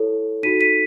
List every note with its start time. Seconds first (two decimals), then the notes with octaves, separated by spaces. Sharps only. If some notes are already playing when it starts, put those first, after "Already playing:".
Already playing: E4 A4 C#5
0.43 D#4 F#4 A4 B6 D#7
0.61 B6 D#7